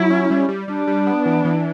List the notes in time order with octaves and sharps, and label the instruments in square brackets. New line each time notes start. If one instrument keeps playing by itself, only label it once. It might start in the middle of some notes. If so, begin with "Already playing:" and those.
Already playing: [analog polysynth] F#3 [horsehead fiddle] E4
[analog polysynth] C#4
G3
G3
[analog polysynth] G3 [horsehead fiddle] D4
[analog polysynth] G3
B3
E3
E3